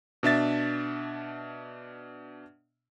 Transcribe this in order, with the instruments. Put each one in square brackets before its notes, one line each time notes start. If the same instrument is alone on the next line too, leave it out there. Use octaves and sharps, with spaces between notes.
[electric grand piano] B2 D4 E5 A6